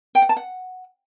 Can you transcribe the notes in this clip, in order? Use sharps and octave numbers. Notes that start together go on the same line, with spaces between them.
G5
F#5
A5
F#5